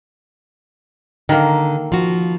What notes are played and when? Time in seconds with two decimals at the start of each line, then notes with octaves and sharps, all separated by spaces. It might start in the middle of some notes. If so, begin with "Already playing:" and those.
1.29 D3 D#3 A#3
1.92 F3 F#4